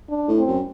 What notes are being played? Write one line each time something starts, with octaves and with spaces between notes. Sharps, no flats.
D4
A2
C4
F#2